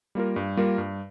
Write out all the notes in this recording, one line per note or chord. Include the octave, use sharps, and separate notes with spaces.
G3 A#3 F4 A#4
G2
G3 A#3 F4 A#4
G2